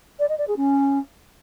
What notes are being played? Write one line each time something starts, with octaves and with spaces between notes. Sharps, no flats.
D5
D#5
D5
G#4
C#4